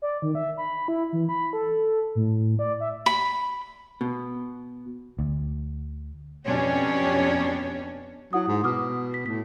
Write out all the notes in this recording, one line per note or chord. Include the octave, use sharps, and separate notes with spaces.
D5
D#3
E5
B5
E4
E3
B5
A4
A2
D5
E5
B5
B2
D2
F2 B2 C#4 D4 G4 C#5
F#3 E4 F#5 D#6
G#2
B2 D6 D#6 F6
B6
A2 B6